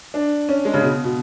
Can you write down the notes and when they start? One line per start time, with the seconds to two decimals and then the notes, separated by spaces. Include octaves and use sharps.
0.14 D4
0.49 C#4
0.65 G#3
0.74 C#3
0.82 B2
1.04 B2